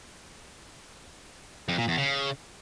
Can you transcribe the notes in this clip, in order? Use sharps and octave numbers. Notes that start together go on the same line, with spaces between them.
F2
A#2
E2
C#3